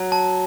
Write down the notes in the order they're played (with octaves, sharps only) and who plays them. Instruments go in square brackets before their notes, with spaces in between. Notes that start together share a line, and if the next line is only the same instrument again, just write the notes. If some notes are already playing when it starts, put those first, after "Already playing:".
Already playing: [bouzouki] F#3
[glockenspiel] A5